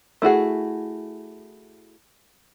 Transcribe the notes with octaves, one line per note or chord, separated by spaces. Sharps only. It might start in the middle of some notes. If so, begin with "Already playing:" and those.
A3 E4 F#4 G#4